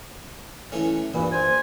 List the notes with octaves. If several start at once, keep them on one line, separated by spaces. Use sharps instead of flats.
E3 A3 C#4
G2 A#2 E3
C5 G#5